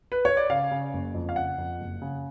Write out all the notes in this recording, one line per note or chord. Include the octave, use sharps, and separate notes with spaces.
B4
C#5
D5
C#3 F5
C#3
F#1
F2
F5
C#3 F#5
F2
F#1
C#3